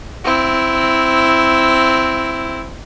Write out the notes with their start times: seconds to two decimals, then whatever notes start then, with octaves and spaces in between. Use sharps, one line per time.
0.24 C4 E4